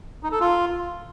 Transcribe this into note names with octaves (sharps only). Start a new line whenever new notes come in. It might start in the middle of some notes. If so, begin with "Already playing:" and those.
D#4
A4
F4